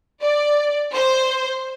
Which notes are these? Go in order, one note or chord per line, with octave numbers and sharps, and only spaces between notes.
D5
C5